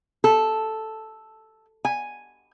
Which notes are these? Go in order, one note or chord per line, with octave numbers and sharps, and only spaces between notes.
A4
G#5